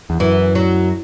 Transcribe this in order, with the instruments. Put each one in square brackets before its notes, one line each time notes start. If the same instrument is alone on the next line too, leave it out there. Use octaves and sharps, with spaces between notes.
[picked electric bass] E2
[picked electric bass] F#2 [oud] E3
[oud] F#3